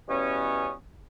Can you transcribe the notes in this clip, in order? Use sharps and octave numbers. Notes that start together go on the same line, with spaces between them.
B2 E3 G3 B3 C#4